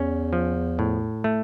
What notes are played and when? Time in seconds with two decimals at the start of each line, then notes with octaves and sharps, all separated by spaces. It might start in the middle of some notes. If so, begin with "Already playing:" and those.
Already playing: E2 C#4
0.33 F3
0.79 A2
1.24 A3